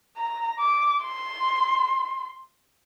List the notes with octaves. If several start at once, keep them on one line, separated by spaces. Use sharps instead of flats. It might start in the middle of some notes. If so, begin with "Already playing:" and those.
A#5
D6
C6